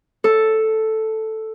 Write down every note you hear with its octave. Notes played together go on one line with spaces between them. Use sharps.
A4